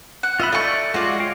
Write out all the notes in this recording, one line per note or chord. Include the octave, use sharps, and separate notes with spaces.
F#5
F4 D#5 E5 B5
A3 D5 C#6
G#3 F4 F#4 D5
C#5 F5 G5